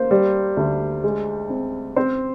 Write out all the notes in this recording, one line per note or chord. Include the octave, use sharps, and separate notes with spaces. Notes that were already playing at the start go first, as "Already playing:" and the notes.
Already playing: A#3 C5
G3
D2
G#3
C4
C4 C5